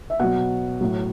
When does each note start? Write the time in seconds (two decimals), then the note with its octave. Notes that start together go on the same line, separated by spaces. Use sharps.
0.10 E5
0.20 B2 F#3 F#5
0.81 A2 F#3